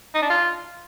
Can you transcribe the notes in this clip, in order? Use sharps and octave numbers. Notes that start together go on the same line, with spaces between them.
D#4
D4
F4